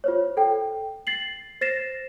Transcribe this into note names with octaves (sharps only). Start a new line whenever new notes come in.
F4 C5 C#5
A4 G5
A6 C7 F#7
C5 A6 A#6 C7 E7